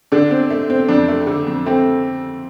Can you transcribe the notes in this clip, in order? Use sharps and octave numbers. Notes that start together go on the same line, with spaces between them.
D3 D4
C4
A3
C4
F2 D4
A3
D3
F2
A3 C4